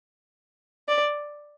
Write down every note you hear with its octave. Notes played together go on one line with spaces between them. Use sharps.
D5